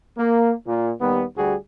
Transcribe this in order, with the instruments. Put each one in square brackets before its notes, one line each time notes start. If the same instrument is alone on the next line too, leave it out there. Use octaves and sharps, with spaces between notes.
[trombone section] A#3
A#2
D#2 G3 B3
D2 G3 F#4 G#4